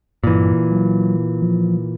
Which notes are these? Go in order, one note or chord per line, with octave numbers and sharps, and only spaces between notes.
G2 A#2 E3
F#3
F3